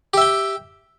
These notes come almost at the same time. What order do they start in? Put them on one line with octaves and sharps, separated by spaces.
G4 E5 G5